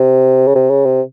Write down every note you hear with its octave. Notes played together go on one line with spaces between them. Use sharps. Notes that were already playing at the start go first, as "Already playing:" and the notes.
Already playing: C3
C#3
C3
C#3
C3